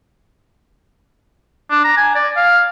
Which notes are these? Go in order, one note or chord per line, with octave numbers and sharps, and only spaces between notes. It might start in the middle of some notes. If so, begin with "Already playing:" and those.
D4
A#5
G#5
D5
F5